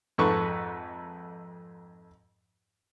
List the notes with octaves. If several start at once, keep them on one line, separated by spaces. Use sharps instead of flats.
F2 G#2 A3 B4 C#6 E6